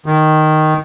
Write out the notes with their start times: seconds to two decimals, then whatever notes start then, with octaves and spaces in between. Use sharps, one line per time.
0.06 D#3